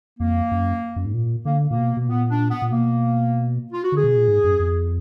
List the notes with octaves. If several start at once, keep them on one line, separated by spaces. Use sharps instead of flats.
F2 A#3
F#2
F#2
G#2
A#2
D3 A#3
A#2 A#3
B2
B2
A#2 B3
D4
B3
A#2
B2 A#3
F4
F#4
D3 G#4
B2
A#2
G#2
F#2
F2